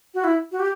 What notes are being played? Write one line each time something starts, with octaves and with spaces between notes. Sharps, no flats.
F#4
E4
F#4
G4